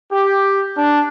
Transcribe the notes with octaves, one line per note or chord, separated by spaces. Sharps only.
G4
D4